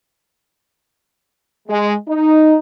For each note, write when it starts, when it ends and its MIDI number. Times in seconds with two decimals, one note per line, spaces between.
1.69 1.95 56
2.08 2.55 63